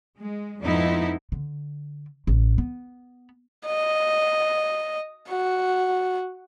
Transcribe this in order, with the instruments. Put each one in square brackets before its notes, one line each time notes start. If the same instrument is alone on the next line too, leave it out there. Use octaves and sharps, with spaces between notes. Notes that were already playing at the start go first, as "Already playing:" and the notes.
[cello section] G#3
F2 G#2 F3 B3 D#4 E4
[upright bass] D3
A1
B3
[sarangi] D#5
F#4